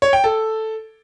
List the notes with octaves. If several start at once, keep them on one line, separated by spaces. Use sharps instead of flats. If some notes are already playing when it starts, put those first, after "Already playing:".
C#5
G5
A4